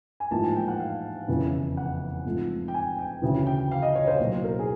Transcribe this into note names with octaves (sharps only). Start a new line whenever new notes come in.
G#5
A1 G#2 F3 A#3 A5
G#5
G5
F#5
F5
F1 E2 C#3 E3
F#5
G#2 F3 A3 C4
G5
G#5
G5
D2 C#3 E3
G5
F5
D#5
C#5
C5
B1 A2 F#3 A#3
A#4
G#4